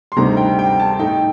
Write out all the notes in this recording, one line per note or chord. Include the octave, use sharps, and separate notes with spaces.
C6
D2 C3 G3 C4 D#4 A#5
G5
G5
A5
A2 A3 D#4 G5